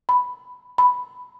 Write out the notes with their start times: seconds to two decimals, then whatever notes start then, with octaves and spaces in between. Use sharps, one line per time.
0.09 B5
0.78 B5